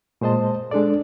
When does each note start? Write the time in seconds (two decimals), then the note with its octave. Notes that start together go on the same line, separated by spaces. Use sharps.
0.21 A#2 G#3 C5 D#5 A5
0.71 G#3 D4 A4 D5